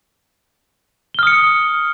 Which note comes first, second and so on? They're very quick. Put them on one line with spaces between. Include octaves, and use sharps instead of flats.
G7 F6 D#6 C#7